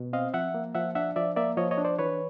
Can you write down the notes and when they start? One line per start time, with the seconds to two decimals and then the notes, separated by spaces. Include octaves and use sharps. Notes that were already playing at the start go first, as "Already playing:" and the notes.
Already playing: B2
0.13 C4 D#5 F5
0.34 F3 E5 F#5
0.54 A#3
0.75 F3 E5 F#5
0.95 D4 E5 F#5
1.16 F3 D5 E5
1.36 A#3 D5 E5
1.57 F3 C#5 D#5
1.71 C#5 D#5
1.78 D4
1.85 C5 D5
1.99 E3 B4 C#5